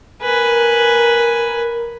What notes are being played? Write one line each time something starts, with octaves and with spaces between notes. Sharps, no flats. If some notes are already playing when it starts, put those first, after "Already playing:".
A#4 B4 G#5